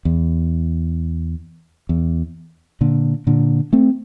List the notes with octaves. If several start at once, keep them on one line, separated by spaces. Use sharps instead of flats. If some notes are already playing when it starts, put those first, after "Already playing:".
E2
E2
A#2 D3
A#2 D3
A3 C4